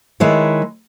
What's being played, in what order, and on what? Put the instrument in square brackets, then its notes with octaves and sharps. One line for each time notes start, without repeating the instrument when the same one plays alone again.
[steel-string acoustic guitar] D#3 G#3 E4 B4 C#5